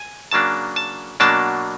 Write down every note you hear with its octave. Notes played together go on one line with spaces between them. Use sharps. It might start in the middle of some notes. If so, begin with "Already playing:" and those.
Already playing: G#5
C#3 F#3 A#3 D4 A5
A5
B2 F#3 A#3 D4 A5